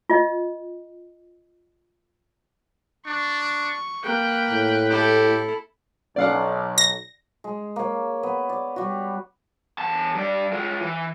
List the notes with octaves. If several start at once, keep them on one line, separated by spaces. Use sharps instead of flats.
F4 D#5
D4 C#6
A#3 B4 G5 F#6
A2
E4 G4 A4
B1 D5 F5 F#5
A#6
G#3
A#3 C#5
B3
D5
G3 F#4
E2 A5
G2 D5
G#3 F4
E3